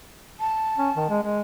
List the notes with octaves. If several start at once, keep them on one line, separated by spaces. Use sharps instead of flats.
A5
C#4
D#3
G#3
G#3